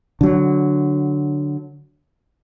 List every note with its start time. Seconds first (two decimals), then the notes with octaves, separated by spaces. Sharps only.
0.21 D3 F#3